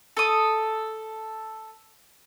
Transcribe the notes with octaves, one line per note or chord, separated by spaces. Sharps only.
A4 D#6